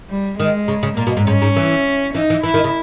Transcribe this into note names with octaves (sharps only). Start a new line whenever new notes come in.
G3
D#3 G#3
C#3
C#3
A#2 A#3
B2
G#2
G#2 C#4
G#2
E3
E3 D#4
E3
E3 E4
D#3
C#3